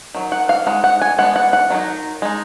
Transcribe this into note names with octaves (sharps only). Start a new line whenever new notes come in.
D#3 F#3
F#5
F5
G#3 D#4 F#5
F#5
G#5
G#3 B3 D4 F#5
F#5
F#5
D#3 F#3 D#4
G#3 D#4